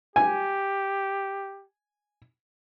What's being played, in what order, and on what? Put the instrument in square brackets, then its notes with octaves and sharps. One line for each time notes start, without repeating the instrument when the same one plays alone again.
[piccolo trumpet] G4 [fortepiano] G#5